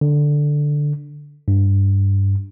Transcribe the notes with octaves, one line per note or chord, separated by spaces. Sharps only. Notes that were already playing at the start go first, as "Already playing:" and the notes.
D3
G2